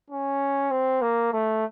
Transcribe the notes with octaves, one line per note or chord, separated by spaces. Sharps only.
C#4
C4
A#3
A3